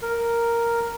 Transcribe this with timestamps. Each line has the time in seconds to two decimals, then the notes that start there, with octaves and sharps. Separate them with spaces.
0.02 A#4